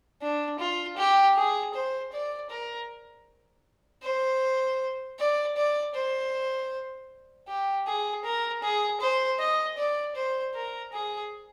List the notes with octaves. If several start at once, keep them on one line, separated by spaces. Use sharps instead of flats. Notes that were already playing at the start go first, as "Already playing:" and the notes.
D4
F4
G4
G#4
C5
D5
A#4
C5
D5
D5
C5
G4
G#4
A#4
G#4
C5
D#5
D5
C5
A#4
G#4